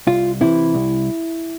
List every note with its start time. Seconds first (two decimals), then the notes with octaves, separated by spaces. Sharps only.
0.07 C2 F4
0.41 C3 E3 E4
0.75 C2